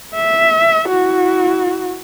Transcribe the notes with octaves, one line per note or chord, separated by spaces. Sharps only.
E5
E4 F#4